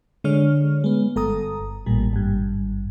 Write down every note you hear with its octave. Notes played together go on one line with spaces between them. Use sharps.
D3 G#3 C#5 F6
G#3 B3
G1 A4 A#5 D#6
A1 A#2 G3
G#1 G2